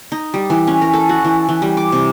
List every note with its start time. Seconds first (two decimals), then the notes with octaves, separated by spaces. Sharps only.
0.12 D#4
0.34 G3
0.50 E3
0.67 C#4
0.81 A#4
0.93 A4
1.09 F#4
1.24 E3
1.49 E3
1.62 G3
1.77 D6
1.92 C3